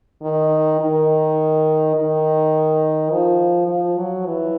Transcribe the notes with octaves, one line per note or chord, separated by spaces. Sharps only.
D#3
D#3
D#3
F3
F3
F#3
E3